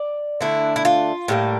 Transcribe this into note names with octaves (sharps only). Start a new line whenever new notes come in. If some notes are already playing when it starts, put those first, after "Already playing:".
Already playing: D5
D3 A3 D4 E4
E4
F4
A2 G3 A#3